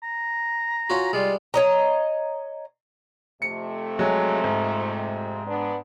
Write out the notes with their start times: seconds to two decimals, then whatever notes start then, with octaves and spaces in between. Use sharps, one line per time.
0.03 A#5
0.90 C#4 F4 F#4
1.13 G3 G#3 F4
1.54 C#5 D#5 A#5
3.42 F2 C3 A3 C#7
3.99 F#3 G#3
4.44 G#2
5.46 B3 D4